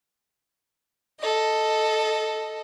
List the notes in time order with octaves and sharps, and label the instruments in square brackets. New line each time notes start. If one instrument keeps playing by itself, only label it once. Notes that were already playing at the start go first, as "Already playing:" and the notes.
[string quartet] A4 D#5